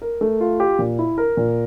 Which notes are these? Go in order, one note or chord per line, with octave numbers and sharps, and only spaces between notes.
A#4
A3
F4
G4
A#2
E4
A#4
A#2